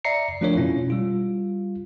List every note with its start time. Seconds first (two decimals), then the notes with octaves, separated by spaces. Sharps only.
0.05 D5 E5 A#5 C7 C#7
0.41 F3 A3 D4 F4 A#4 C#5
0.55 B2 C#4 E4 F4
0.90 G3 F4